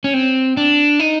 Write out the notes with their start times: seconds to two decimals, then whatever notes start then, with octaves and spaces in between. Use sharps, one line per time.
0.04 C#4
0.14 C4
0.57 D4
1.00 D#4